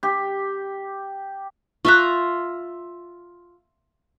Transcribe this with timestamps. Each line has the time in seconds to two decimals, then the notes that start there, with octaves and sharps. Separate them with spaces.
0.03 G4
1.85 F4 E5 A#5 C#6 F#6